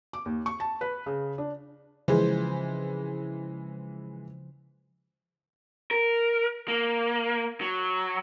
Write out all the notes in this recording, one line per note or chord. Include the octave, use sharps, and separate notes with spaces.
D6
D#2
C#6
A5
B4
C#3
D4
C#3 E3 F3 G#3 C5
A#4
A#3
F#3